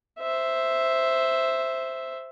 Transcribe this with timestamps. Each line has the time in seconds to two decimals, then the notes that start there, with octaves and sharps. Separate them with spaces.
0.19 C5 E5